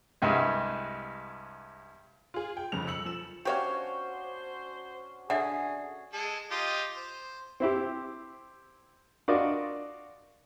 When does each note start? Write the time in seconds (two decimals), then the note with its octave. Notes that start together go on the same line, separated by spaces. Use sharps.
0.22 C2 G2 G#3
2.34 F4 G#4
2.57 G5
2.72 F1 F2 C#3 F7
2.88 E6 C#7 F#7
3.05 F3 E7
3.45 C#4 D4 F#4 G4 C5 C#5 F5
5.30 D3 G#4 E5 F#5
6.13 G#3 A4
6.51 F4 G4 D#5
6.97 C5
7.60 C4 E4 G4
9.28 D4 F4 F#4 A#4 D5 D#5